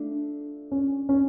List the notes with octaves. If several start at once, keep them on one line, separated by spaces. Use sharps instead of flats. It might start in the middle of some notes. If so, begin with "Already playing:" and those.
Already playing: A3 D4 F4
C#4
C#4